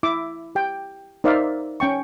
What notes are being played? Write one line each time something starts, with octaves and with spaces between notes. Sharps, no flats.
E4 E5 D6
G4 G5
D#4 A#4 C5 D5 E5 F5
C#4 G5 C#6